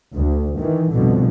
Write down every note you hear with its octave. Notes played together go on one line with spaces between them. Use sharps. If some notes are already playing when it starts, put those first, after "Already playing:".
D2
D#3 E3
C2 F2 B2 D3